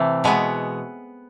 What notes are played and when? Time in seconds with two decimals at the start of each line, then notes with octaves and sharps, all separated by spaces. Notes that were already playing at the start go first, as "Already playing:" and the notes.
Already playing: C3 E3 A3
0.24 B2 G#3 B3